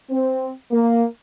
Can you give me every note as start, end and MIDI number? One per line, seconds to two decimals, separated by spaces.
0.10 0.50 60
0.71 1.04 58